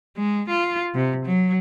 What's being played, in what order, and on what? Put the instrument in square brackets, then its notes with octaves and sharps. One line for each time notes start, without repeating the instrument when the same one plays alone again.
[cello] G#3
F4
C3
F#3